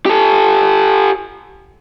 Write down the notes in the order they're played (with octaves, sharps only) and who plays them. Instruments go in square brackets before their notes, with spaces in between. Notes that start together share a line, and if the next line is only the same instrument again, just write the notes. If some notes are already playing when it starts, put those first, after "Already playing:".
[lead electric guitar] G4 A4